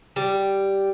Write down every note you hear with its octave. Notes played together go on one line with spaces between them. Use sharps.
G3